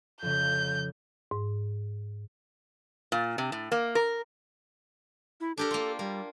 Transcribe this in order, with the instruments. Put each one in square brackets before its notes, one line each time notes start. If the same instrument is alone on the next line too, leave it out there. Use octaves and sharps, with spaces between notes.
[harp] F2 C#3 [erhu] G6
[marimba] G#2
[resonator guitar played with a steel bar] A#2
C3
A2
A#3
A#4
[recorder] E4
[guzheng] D4 G4 A#4 [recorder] A4
[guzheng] A#3 F4
[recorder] G3 [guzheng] A#3